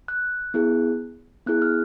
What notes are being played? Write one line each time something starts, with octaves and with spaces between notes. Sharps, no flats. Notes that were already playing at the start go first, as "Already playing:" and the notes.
F#6
B3 E4 G#4
B3 E4 G#4 F#6
F6